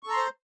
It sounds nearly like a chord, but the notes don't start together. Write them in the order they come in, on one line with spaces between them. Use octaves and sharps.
C#6 A4 A#5 C6 C5